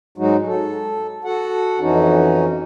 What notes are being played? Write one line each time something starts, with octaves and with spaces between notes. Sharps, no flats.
G#2 F#3 G#3 D#4 F#4
A4
F#4 A4 F#5
F2 E3 C#4 D#4 F#4